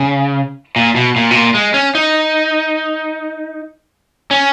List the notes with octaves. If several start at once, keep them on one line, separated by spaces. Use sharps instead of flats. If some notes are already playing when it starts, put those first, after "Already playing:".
Already playing: C#3
A#2
B2
A#2
B2
A#2
G#3
C#4
D#4
C#4